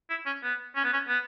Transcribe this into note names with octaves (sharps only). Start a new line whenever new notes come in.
E4
C#4
B3
C#4
B3
C#4
B3